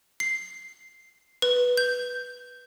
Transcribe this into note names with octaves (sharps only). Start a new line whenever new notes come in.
C7
B4
G6